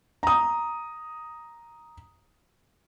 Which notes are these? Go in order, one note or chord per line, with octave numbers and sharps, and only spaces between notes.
A#5 D#6